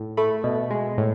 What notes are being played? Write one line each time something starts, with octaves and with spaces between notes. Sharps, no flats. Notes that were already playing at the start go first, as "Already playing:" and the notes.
Already playing: A2
A3 B5
B2
G#3
A2